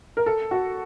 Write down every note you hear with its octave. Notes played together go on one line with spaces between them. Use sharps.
A#4
A4
F#4